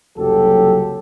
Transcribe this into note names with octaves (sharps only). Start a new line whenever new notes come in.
F#1 C2 F#3 G4 A4